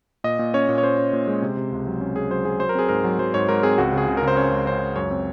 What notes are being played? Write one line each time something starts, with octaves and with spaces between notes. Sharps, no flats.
A#2 D#5
A#2
C#4 C#5
A#2
C#5
C#4 C5
C#4
A#2
G#3
C3
C3
C#2
F#3
C#4
C#4 G#4
F#3 C5
F#3 G#4
F#3 C5
A#4
C4 G#4
G#2 A#4
F#3
F#3 C5
G#2 C#5
G#2 A#4
C4 G#4
C#2 F#4
C#3 G#4
C#3
A#4
C#3
C5
C#4 C#5
C#2
C#3 C5
C#2
F#2 C#5
C4